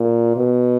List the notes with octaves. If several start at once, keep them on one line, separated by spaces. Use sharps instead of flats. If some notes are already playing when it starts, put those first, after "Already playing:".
Already playing: A#2
B2